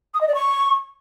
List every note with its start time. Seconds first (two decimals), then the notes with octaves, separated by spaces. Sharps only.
0.14 D#6
0.21 D#5
0.28 D5
0.35 C#6